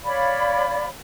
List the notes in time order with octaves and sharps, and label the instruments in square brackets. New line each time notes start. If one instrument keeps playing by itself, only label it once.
[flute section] C#5 D5 F5 B5